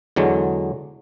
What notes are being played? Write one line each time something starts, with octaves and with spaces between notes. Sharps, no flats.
E2 D3 F#3 G#3